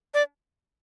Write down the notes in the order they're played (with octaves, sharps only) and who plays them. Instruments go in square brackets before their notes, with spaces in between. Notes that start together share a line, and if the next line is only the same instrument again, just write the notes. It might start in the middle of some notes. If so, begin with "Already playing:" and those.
[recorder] D5